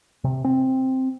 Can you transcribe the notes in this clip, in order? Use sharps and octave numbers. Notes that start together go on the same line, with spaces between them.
C3
C4